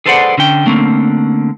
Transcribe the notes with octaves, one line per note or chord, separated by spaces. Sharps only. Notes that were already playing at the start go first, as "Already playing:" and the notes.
G#4 A4 B4 C5 D5 F#5
D3 C#4 G5
D3 A3 A#3 C4 C#4